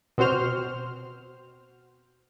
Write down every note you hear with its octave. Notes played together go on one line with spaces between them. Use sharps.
B2 C4 F#4 C5 F6